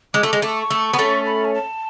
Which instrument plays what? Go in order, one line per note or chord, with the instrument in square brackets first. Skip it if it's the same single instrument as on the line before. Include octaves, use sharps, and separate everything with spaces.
[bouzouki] G#3 [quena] D6
[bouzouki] A3
[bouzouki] G#3 [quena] D6
[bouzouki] A3 [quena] D6
[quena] C#6
[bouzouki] A3
B3
A3 C#4
[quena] B5
G#5
A5